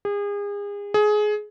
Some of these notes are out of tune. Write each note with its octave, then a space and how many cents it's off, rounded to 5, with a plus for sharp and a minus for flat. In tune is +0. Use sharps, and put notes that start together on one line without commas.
G#4 -35
G#4 +20